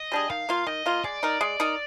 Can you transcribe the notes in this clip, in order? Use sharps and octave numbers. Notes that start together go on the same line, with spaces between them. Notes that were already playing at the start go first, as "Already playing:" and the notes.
Already playing: D#5
G3 D4 G#4
D#3 F5
A#3 F4
D#3 D#5
A#3 F4
G#3 D5
D#4 A#4
G#3
D#4 A#4